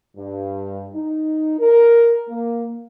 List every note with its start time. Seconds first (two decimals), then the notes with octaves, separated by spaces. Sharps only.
0.16 G2
0.94 D#4
1.59 A#4
2.28 A#3